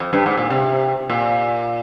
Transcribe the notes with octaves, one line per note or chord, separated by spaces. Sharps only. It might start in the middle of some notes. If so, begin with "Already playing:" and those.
F2
G2
G#2
A#2
C3
A#2